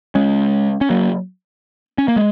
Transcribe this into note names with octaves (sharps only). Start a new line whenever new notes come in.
G#3 C#4
C#4
F#3 A#3
C#4
A#3
G#3